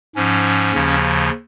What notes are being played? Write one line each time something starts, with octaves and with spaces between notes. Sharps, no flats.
G#2 F3 C#4
D#2 C#3 F3